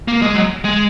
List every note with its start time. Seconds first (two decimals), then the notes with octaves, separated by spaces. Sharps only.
0.08 A#3
0.22 G#3
0.35 F#3
0.65 G#3